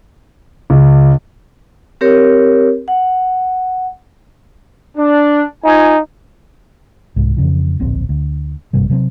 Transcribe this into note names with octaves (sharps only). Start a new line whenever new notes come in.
C#2
C4 G4 A#4 C#5
F#5
D4
D#4 F4 G#5
C2 G#2
F2 C#3 E3
D1 A#1 C4
D2
A1 G2 C3 G3
C3 F#3 A#3 C4